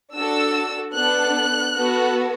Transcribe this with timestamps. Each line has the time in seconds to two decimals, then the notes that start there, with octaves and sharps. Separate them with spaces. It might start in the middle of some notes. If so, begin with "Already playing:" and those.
0.13 D4 F#4 A4 E6
0.94 B3 D4 A4 F#6
1.75 B3 F#4 A4